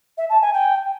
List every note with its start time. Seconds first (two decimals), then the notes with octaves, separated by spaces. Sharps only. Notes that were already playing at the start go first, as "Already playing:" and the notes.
0.18 E5
0.30 A5
0.41 G#5
0.53 G5